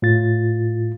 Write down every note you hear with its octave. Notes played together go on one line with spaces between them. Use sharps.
A2 F4 A6